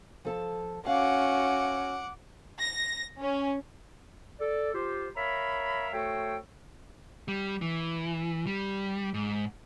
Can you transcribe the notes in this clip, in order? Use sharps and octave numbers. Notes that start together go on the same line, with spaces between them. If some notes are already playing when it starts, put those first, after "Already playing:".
F3 A4 A5
C#4 F#4 F5 F#5 D6
A#6
C#4
A4 D5
F4 G4 C5
A#4 C#5 E5 F5 A#5 B5
A3 F#4 A4 C5 C#5 G5
G3
E3
G3
G#2